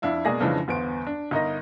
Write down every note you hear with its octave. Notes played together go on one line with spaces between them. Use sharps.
F2 D4 E4 F5
B2 G#3 A#3 G#4 D5 A#6
F2 C#3 E3 F3 G#3 D4
G1 E2 B3 C5 D7
D4
G1 D#4 A#4 D#5